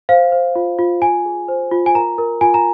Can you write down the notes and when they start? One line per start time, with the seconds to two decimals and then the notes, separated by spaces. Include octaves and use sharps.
0.09 C5 F5
0.32 C5
0.56 F4
0.79 F4
1.02 F4 G#5
1.25 G#4
1.48 C5
1.72 F4
1.86 G#5
1.94 A#4 A#5
2.18 A#4
2.41 F4 G#5
2.54 A#5